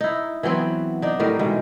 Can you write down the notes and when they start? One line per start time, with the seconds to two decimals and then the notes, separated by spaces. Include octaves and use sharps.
0.01 D#4 E4
0.43 E3 F#3 B3 C4
1.02 D4 D#4
1.20 A2 D#3 G3 A#4
1.39 B2 D#3 E3 G#3